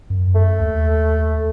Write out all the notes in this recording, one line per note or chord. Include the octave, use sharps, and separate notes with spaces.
F#2
A3
D#2